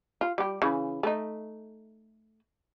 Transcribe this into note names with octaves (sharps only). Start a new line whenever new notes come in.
F4
G3 G4
C#3 E3
A3 D#4